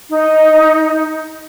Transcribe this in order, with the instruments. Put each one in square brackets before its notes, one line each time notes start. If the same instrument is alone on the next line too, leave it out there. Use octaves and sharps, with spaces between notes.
[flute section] D#4